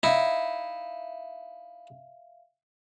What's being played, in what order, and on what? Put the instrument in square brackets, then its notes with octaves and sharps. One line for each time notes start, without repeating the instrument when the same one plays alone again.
[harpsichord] D#4 E4 [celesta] E5 F5